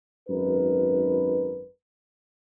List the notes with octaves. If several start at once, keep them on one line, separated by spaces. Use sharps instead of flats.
G#1 F#2 D#4 A#4 B4